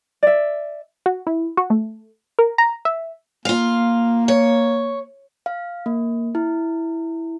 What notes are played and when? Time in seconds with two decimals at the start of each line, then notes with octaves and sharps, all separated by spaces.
0.23 D5 E5
1.06 F#4
1.27 E4
1.57 F#4
1.70 A3
2.39 A#4
2.58 A#5
2.85 E5
3.45 A#3 F4 F5
4.28 C#5
5.46 F5
5.86 A#3
6.35 E4